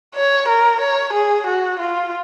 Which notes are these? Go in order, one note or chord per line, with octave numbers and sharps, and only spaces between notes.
C#5
A#4
C#5
G#4
F#4
F4